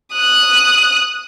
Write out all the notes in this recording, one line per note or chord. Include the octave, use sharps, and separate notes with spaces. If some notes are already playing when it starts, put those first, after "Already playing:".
D#6 F#6